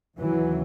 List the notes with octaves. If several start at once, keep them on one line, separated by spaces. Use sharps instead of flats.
D#2 C#3 E3 F#3